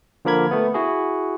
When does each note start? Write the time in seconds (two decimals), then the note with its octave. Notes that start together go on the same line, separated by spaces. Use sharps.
0.25 D3 F3 A#3 A#4 B5 G#6
0.51 A3 B3
0.74 E4 F#4 G#4